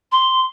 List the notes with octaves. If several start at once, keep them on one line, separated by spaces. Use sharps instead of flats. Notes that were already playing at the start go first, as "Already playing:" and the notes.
C6